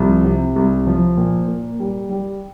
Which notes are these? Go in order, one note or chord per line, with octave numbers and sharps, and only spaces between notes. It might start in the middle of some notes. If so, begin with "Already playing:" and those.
Already playing: C2 F3
C3
C2
F3
A#2
A#3
G3
G3